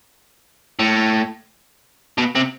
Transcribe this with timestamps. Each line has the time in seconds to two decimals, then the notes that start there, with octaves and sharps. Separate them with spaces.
0.79 A2
2.18 B2
2.35 C3